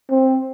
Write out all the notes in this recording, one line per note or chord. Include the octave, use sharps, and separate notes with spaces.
C4